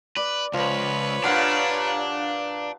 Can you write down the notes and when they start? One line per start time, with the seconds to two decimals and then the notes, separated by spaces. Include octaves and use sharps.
0.17 B4 D5
0.53 C#2 F3 B4 C#5
1.24 G2 A#2 D4 F5 F#5 A5